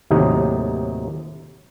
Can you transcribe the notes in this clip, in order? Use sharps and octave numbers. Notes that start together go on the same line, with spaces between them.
D#2 A2 C3 F#3 D#4